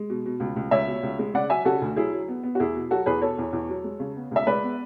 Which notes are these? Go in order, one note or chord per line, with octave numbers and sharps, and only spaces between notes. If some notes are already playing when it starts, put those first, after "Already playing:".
Already playing: G#3
B2
B2
C#2
C#2
C#2 C#5 E5
B2
C#2
G#3
C#3 D5 F#5
F#3 E5 G#5
C#3 F#4 A4
D2
F#3 E4 G#4
F#3
B3
B3
F#4
E2 E4 G#4
B2
F#3 F#4 A4
E2 G#4 B4
B2 A4 C#5
E2
E2
F#3
G#3
C#3
B3
C#2 E5
G#3 B4 D5
B3